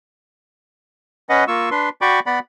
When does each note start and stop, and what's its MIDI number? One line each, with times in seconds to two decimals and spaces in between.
1.29 1.44 61
1.29 1.44 71
1.29 1.44 75
1.29 1.44 78
1.48 1.69 58
1.48 1.69 65
1.48 1.69 85
1.48 1.69 88
1.71 1.89 62
1.71 1.89 71
1.71 1.89 84
2.01 2.20 66
2.01 2.20 74
2.01 2.20 79
2.01 2.20 83
2.01 2.20 85
2.01 2.20 86
2.26 2.39 59
2.26 2.39 74
2.26 2.39 78
2.26 2.39 83